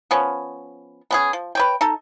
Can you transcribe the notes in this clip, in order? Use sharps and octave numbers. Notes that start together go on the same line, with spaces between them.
F3 B3 C#4
B3 C#4 G#4
F3
B4 C#5 G5
D#4 A4